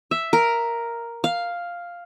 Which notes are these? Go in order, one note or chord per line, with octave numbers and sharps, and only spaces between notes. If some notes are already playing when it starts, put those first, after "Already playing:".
E5
A#4
F5